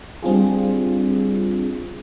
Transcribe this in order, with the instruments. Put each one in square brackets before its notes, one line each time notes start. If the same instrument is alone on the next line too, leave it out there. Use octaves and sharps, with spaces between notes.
[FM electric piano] G3 C4 D4 F4 G#4